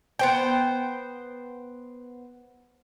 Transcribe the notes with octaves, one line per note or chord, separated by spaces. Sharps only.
B3 C5 G5